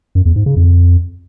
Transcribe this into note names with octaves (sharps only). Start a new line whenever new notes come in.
F#2
E2
G#2
C#3
F2